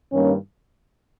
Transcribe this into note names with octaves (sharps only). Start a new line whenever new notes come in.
G2 D#3 G3 A#3 C#4